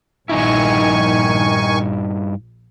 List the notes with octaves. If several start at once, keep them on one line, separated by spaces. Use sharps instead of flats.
A#1 G2 D#3 D#4 E4 G#5 C#6